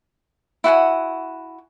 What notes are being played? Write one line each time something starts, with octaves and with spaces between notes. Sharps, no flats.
E4 F#4 F#5 G#5